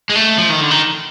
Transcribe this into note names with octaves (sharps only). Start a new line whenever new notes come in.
G#3
A3
F3
D#3
D3
D#3